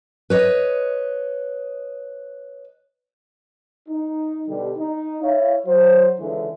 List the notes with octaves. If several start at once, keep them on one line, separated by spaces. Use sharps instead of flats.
B4 C#5 D#5
D#4
B2 D3 G3
D#4
E4 C#5 F5
F#3 C5
C#2 D3 E3